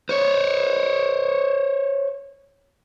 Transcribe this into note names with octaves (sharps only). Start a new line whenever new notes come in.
C5 C#5